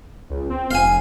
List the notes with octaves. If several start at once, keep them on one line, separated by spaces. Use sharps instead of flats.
C#2
C4
F1 F5 G#5